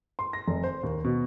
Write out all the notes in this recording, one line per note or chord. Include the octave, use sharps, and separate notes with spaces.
C6
A#6
F1
C5
D#2
B2